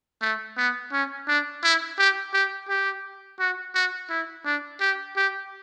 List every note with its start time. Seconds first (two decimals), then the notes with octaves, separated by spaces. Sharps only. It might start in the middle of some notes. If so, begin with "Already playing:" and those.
0.22 A3
0.57 B3
0.92 C#4
1.28 D4
1.63 E4
1.98 G4
2.34 G4
2.69 G4
3.40 F#4
3.75 F#4
4.10 E4
4.45 D4
4.81 G4
5.17 G4